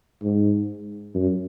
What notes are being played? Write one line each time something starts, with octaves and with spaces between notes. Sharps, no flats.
G#2
F#2